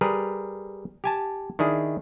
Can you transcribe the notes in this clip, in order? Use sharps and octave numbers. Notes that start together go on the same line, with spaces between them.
G3 G#4 A#4 B4
G4 G#5 A5
D#3 D4 E4 G#4